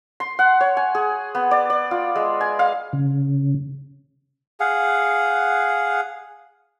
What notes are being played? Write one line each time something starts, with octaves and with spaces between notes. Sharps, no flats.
C6
F#5
C#5
G#5
G#4
B3
D5
D5
F4
G#3
G#5
F5
C#3
G#4 F5 F#5